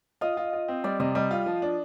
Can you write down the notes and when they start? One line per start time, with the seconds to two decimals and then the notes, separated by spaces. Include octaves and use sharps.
0.21 F4 D#5
0.37 F4
0.53 F4
0.68 C4
0.84 G3 D5
1.00 C3 D#5
1.15 G3 D#5
1.31 F4
1.46 F3
1.62 D4